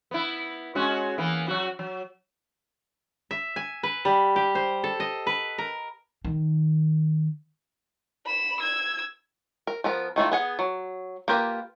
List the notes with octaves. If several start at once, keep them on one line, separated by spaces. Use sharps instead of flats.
B3 E4
G#3 C#4 F#4
E3 A#3 B3
F#3 F#4
F#3
E5
G#5
B4
G3
G4
C5
A4
D#5
B4
A#4
D#3
B5 E7
E6 G#6
A#4
F3 B3 A#4
D#3 A3 E4 F4
B3 G#4 F#5
F#3
A#3 F4 G4 A#4 B4